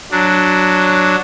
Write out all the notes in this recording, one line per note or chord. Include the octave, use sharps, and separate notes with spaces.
F#3 D4